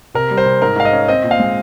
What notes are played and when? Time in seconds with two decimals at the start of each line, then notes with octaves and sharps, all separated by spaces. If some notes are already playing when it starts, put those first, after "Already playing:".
0.14 C3 A#4
0.31 G3
0.37 C5
0.46 C3
0.62 G#2 A#4
0.76 G#2 F5
0.85 D#5
0.93 C#4
1.08 C4 D#5
1.23 A#2
1.31 F5
1.40 G#3